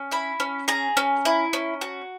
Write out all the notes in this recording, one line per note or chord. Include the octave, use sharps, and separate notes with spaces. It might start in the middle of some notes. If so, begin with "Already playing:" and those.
Already playing: C#4
E4 B5
C#4
G#4 A#5
C#4
E4
C#4
F#4